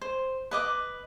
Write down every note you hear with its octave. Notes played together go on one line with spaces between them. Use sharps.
C5
B4 D#5 D6